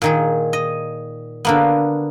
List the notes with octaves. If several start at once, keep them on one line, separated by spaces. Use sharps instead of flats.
A#2 D#3 G#4
D#5
D3 A#3 B3